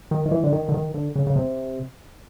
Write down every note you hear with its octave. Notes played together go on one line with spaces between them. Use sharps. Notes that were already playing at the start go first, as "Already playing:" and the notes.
D#3
D#3
E3
D3
D#3
D3
D#3
D3
C#3
C#3
C3